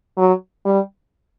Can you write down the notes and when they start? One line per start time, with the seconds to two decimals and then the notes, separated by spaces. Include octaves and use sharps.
0.17 F#3
0.65 G3